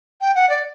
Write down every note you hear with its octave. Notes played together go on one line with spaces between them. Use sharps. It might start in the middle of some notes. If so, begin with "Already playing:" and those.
G5
F#5
D5